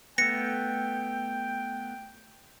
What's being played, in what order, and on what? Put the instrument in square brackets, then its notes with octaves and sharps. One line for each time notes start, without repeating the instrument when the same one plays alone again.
[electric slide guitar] A3 B3 [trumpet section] G5 [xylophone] A#6 C#7